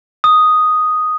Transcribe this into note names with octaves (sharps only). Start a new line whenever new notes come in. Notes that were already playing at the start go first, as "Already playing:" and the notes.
D#6